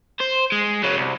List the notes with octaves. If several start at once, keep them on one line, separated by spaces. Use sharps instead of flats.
C5
G#3
C#3 F#3
C2